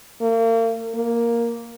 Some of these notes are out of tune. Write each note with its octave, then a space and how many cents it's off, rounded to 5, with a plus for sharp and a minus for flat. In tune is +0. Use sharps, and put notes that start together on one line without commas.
A#3 -40
A#3 +5